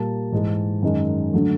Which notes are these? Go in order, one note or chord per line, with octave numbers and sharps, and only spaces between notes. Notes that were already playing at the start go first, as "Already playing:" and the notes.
Already playing: A#2 G3 A#3 A5
G#2 E3 G#3
F#2 D#3 G#3
D3 F#3 A3